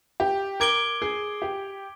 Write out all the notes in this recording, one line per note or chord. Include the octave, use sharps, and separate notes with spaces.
G4
A#4 D6 G#6 D7 G7
G#4
G4